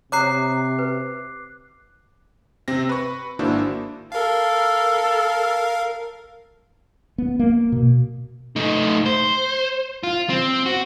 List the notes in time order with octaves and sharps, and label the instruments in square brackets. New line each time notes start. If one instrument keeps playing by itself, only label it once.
[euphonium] C3 [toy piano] C#5 A#5 D#6 [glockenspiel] D6 F#6 C7
[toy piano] B4
[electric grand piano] C3 C4 A#6
B4 C#6
G#1 A#3 D4 E4 F#4 C5
[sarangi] A4 [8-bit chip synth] A#4 F5
[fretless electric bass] B3
A#3
B2
[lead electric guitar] A3 D#4
C5
F4
C4
F#4